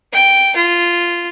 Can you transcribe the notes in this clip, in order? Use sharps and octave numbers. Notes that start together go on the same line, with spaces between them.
G5
F4